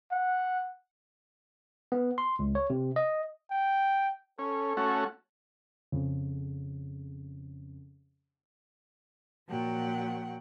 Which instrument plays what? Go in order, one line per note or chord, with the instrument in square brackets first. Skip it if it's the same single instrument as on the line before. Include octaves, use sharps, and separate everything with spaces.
[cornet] F#5
[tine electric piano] B3
C6
C#2
C#5
C3
D#5
[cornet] G5
[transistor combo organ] C#4 [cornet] A4
[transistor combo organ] A3 C#4 F#4
[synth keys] F2 C#3
[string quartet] A#2 F3 F#3 F#5 G5